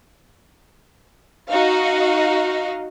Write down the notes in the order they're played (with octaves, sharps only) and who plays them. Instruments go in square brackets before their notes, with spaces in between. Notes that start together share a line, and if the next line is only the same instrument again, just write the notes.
[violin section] D#4 F#4 D#5 F5